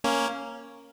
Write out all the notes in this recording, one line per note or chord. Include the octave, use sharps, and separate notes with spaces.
A#3 C#4